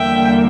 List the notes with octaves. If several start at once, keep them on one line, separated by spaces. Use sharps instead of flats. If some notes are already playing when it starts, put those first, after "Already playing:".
Already playing: E2 D3 G3 A#3 E5 G5